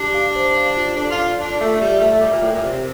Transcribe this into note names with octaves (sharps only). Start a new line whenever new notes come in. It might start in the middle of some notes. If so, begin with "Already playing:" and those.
Already playing: D4 G4
F5
C5
F5
F4
D4 A4
F4
D5
D4 F4
A3 F4
G3 E5
A3 E5
G3 D6
A#2
A2 G5
A#2
C3 G4